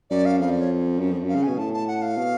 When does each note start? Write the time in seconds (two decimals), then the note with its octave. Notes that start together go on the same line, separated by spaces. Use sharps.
0.10 F#2 D5
0.26 F5
0.40 F2 F5
0.50 D5
0.61 C#5
0.99 F#2
1.11 F2
1.24 F#2
1.29 F5
1.35 C#3
1.43 B2 G#5
1.58 A2 A5
1.74 A5
1.88 F#5
2.02 F5
2.18 B2